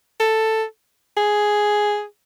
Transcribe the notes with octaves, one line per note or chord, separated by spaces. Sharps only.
A4
G#4